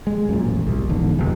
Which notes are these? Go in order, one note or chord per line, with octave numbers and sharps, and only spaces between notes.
G#3
F#2 A#2
A1
C2
F1 E2 G#2 D3
F1 B2